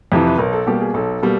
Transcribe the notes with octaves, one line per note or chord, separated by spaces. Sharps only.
F2 C3 E3
B4
B1 A#4
A4
B2 G3 A#3 G4
G#4
B1 A4
B2 G3 A#3